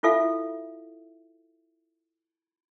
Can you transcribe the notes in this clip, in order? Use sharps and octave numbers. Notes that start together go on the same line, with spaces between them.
E4 F4 A4 E5 F5